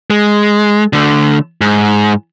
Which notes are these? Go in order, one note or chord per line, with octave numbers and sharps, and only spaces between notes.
G#3
D3 A3
G#2